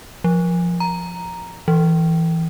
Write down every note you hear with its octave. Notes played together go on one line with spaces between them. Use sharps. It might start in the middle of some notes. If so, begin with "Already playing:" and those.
F3
A#5
E3